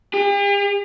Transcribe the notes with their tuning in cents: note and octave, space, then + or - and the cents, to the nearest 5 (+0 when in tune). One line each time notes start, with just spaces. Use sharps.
G4 +45